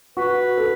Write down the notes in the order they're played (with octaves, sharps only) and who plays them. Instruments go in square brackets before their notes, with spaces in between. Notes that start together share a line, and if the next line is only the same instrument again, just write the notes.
[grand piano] F#4 [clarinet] B4
[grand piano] A4